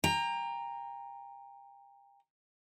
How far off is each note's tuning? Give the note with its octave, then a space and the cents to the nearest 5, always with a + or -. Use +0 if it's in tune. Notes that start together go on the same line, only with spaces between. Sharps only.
G5 +35 A#5 +0